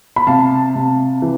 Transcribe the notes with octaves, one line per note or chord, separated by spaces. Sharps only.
B5
C3 F5 A5
C3
E3